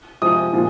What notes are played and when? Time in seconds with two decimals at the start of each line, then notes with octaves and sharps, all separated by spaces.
0.22 C3 F3 G#3 D#6
0.53 A#2 F3 G#3